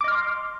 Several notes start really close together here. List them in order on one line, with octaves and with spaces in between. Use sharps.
D6 D#5 F6 C6